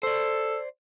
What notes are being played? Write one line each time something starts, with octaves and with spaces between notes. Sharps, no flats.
A4 C5 D5